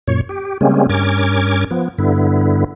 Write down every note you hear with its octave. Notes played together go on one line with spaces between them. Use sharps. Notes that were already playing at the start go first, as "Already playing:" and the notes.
F#2 A#2 C#5
G4
C#3 G3 G#3 A#3 C4 C#4
G2 C#4 A#4 D6 G#6
F3 B3
G2 D3 B3 E4